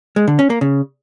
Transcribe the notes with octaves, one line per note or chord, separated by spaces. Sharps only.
G#3
D3
C#4
A#3
C#3